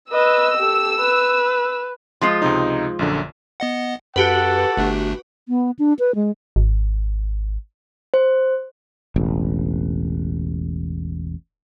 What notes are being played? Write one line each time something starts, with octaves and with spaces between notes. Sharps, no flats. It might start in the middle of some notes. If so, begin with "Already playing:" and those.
B4 D#5 E6
G4 A4
B4
F3 G#3 F4
C#2 C3 D#4
A#1 F#2 D3
B3 D#5 F#5
F#2 F#4 G4 A4 B4 F#5
G1 A3 D4
B3
D4
B4
G#3
G#1
C5
E1 A1